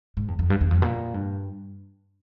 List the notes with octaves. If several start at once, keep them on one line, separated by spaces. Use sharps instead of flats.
G#2
E2
F2
G2
E2
F2
A#2
G2